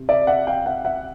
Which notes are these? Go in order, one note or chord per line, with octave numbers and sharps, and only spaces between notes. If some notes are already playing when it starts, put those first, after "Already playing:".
Already playing: C3
D5 E5
E5 F#5
F5 G5
E5 F#5
E5 F#5